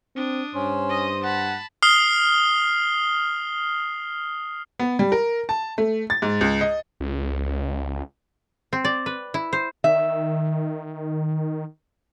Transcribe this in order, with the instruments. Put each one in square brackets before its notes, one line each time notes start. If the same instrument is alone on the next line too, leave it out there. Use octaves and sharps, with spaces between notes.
[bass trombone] C4 [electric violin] D4 D#6
[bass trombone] G2 [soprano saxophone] C#4 [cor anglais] C5
[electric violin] D#5 D#6
[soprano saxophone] F#5 [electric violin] A5 B5
[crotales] D#6 F6 C7 G7
[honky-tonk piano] B3
G3
A#4
A5
A3
A6
G#2
C#2
D#5
[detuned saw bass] C#2
[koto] C4
D5
B4
E4
C5
[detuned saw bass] D#3 [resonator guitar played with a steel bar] E5